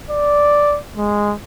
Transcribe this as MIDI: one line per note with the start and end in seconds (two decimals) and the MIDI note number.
0.11 0.78 74
0.97 1.35 56